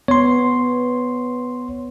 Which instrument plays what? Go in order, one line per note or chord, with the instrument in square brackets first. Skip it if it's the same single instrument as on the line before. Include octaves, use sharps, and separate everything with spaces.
[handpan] B3 [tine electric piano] C#5 C6